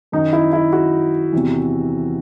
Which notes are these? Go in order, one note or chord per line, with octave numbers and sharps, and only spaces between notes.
F#2 D#3 D#4
E4
E4
F#4
E2 C3 E3